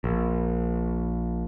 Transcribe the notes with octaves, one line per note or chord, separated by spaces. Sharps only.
A#1